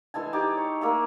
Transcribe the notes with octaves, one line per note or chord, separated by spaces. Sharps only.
E3 G#3 A4 G#5
D#4 G4 D6
C#5
A#3 G#4 E5